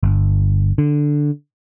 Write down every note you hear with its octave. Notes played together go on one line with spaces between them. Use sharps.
G1
D3